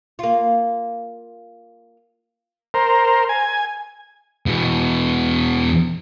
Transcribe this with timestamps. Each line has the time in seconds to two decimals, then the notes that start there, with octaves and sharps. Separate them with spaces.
0.19 A#3 F4
2.74 A#4 C5
3.29 G#5
4.46 E2 B2